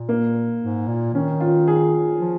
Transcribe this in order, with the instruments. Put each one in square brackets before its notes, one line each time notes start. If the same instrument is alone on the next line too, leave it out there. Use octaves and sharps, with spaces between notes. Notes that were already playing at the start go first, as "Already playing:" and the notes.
Already playing: [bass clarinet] A#2
[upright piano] A#3
[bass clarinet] G#2
A#2
[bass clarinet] D#3 [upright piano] C#4
[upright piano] F4
G#4
[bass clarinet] F3